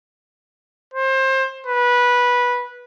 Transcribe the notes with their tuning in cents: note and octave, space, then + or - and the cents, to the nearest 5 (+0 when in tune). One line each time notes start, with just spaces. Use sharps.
C5 +25
B4 -15